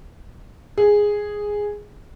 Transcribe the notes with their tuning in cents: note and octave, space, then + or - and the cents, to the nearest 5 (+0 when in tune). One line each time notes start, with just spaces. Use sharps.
G#4 -5